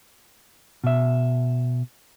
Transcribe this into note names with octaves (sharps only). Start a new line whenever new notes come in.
B2 E5